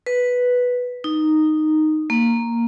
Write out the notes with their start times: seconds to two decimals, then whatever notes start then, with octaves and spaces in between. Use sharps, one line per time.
0.06 B4
1.04 D#4
2.10 A#3